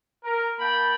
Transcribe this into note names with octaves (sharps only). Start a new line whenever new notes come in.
A#4
A#3 G5 A5 B5